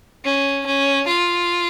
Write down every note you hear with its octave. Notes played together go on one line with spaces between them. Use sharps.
C#4
C#4
F4